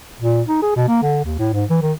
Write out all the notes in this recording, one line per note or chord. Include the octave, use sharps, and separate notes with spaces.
A#2
D#4
G#4
B2
A#3
D3
D#2
A2
G#2
E3
D#3